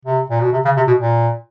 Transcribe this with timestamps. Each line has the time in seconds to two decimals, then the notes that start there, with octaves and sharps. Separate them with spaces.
0.05 C3
0.30 A#2
0.41 B2
0.53 C3
0.65 C#3
0.77 C3
0.88 B2
1.00 A#2